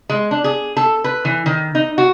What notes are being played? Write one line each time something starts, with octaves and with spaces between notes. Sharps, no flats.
G#3
D4
G#4
A4
B4
E3
D#3
D#4
F#4